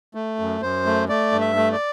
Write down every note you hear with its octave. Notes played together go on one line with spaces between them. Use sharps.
A3
F#2
F#2 C5
A3
A3 D5
G2
E5
A3
D5